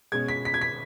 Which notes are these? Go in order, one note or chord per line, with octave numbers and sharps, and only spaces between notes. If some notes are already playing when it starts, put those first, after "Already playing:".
B2 G#3 C#4 G#6
B6
B6
G#6
B6